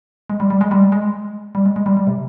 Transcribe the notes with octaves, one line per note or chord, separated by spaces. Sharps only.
G#3
G3
G3
G#3
G3
G#3
G3
G#3
G#3
G3
G3
C3